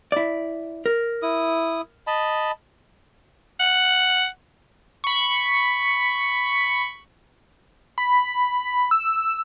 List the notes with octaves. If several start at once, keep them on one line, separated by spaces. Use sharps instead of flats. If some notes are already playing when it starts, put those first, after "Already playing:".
E4 D5
A#4
E4 D#6
D#5 A5 B5
F#5
B5 C#6
B5
E6